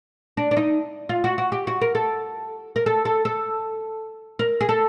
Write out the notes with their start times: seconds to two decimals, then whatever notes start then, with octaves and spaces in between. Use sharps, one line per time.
0.37 D4
0.51 D4
0.57 D#4
1.09 F4
1.24 F#4
1.38 F#4
1.52 G4
1.67 F#4
1.81 A#4
1.95 A4
2.76 A#4
2.86 A4
3.05 A4
3.25 A4
4.39 A#4
4.61 G#4
4.69 A4